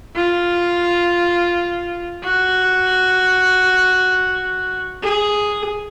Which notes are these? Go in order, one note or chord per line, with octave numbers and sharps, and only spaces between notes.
F4
F#4
G#4